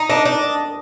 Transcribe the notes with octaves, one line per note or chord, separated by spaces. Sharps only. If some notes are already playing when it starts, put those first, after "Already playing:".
Already playing: D#4
D4 D#5
D4